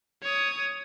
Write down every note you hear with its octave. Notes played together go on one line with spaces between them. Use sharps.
C#5 D#6